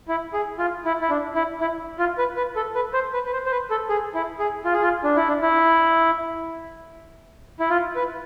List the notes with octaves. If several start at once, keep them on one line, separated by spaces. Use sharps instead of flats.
E4
G#4
F4
E4
E4
D4
E4
E4
F4
B4
B4
A4
B4
C5
B4
B4
C5
C5
B4
A4
G#4
E4
G#4
F4
G#4
F4
D4
E4
D4
E4
E4
F4
B4